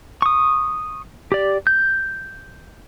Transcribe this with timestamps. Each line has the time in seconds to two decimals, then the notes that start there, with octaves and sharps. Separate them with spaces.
0.22 C#6 D#6
1.32 G4 D5
1.67 G6